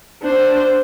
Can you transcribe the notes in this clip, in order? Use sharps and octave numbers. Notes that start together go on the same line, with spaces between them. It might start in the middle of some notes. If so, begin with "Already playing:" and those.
D4 C5